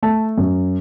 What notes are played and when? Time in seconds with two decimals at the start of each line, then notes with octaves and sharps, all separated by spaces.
0.02 A3 A5
0.38 F#2